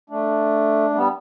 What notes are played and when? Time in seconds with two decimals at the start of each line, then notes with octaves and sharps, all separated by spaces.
0.10 A3 D4
0.90 A3
0.95 G3 B3